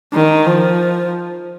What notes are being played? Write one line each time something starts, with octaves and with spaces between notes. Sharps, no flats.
D#3
F3